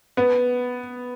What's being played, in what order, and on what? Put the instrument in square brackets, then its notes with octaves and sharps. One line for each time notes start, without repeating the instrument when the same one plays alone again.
[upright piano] B3